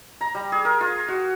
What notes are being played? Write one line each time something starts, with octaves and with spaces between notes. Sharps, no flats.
A#5
G3
G#4
A#4
F4
F#4